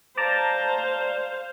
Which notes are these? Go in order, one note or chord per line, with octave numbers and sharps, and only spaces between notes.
C5 D5 F5 A5 A#5